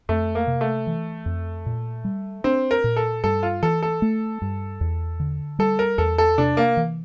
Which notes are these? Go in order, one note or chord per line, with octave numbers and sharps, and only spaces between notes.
F2 A3
A#3
C3
A3
E3
F2
A#2
G3
C4 D4
A#4
A#2
A4
G2 A4
F4
E3 A4
A4
A3
G2
E2
D3
G3 A4
A#4
E2 A4
A4
C3 D4
A#3
E3